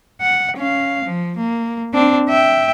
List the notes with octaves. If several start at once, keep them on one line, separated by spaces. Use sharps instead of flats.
F#5
C#4 F5
F3
A#3
C4 D4
E5 G5